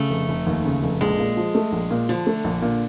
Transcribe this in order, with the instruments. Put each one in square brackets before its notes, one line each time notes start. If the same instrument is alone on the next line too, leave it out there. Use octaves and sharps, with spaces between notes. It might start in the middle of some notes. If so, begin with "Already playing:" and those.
Already playing: [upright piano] C#3 [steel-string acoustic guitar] A3
[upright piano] F1
F1
D#2
C#3
F1
[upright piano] A#1 [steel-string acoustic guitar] G#3
[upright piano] A#2
F3
A3
A#1
A#2
[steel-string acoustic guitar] D3 [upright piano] F3
[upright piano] A3
A#1
A#2